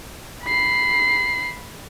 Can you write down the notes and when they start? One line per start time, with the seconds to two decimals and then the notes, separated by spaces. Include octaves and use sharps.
0.44 B5 C7